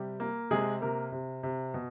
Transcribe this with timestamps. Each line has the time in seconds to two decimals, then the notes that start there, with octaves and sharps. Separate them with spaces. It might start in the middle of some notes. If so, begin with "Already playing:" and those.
Already playing: C3 G3 G4
0.20 A#3
0.51 C3 G#3 G#4
0.81 C3 A#3 A#4
1.12 C3
1.43 C3
1.74 B2